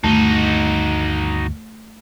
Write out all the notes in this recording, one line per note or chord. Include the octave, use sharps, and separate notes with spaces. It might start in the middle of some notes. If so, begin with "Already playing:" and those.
D2 G2 D#3 A3 D#4 F#4